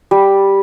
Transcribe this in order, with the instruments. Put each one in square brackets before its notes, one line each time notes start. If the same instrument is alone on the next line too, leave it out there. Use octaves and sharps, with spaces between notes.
[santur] G3